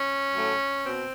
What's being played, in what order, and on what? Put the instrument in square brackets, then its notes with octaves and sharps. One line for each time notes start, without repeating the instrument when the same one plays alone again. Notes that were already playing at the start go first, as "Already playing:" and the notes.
Already playing: [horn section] C#4
A2 F#3 A3
B2 C4